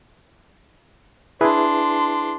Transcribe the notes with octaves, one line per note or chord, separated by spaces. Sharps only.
D4 E4 G#4 B4 C6